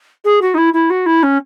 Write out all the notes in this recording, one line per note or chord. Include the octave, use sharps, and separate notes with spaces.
G#4
F#4
D#4
E4
E4
F#4
E4
C#4